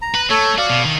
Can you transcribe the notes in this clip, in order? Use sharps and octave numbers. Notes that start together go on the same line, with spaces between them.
A#5
B4
A3 A4 C#5
F#4 D5 F5
B2
D#3